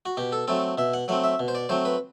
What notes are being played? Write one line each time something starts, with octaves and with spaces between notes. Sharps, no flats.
F#4
B2 G4
A4
F#3 A3 C4 A4
B2 E5
F#5
F#3 A3 C4 F#5
E5
B2
C5
D5
F#3 A3 C4 C5
B4